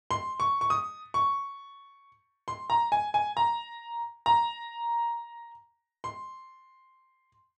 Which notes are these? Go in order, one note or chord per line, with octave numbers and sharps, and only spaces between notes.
C6
C#6
C#6
D#6
C#6
C6
A#5
G#5
G#5
A#5
A#5
C6